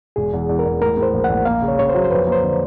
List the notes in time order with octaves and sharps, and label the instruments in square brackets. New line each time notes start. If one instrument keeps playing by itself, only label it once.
[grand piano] E1 [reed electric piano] G#4
[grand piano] E2
E2
[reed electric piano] A#4
[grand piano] E2
[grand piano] A2 [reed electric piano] A#4
[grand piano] A2
[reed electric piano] C5
[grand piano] A#1
[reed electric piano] F#5
[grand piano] A#1
[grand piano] A#3 [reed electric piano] F5
[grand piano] C#3
[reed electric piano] C#5
[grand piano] C#3 [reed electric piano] C#5
[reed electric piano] C5
[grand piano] F#3
[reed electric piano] C5
[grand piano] F2 [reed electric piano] B4
[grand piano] A#3
[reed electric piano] C5
[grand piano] D3